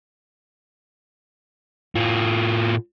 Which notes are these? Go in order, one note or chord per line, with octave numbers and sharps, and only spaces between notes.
A2 F4